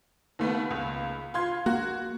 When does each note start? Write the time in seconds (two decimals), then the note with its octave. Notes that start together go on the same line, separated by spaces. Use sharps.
0.39 D#2 A3 B3
0.71 C#2
1.34 F4 C6 G#6
1.66 A#3 F#4